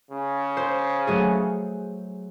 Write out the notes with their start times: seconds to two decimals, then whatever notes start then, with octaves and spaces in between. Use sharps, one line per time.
0.11 C#3
0.57 C5
1.07 F#3 A3 G#4